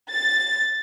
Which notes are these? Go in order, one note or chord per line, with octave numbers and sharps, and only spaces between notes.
A6